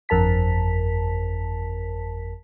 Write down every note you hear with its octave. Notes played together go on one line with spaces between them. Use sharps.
G1 F2 A#4 A5 B6